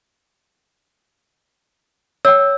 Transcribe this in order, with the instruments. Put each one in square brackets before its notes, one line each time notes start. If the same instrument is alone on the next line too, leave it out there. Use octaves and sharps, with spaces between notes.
[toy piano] C#5 G5 [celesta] E6